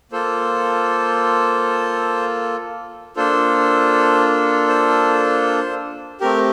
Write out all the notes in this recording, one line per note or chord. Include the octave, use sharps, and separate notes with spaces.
A#3 F4 A4 C5
A#3 D4 F4 A4 C5
C5
A3 C4 G4 A#4